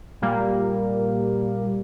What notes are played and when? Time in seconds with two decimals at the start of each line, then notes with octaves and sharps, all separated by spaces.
0.22 A#2 G3 A#3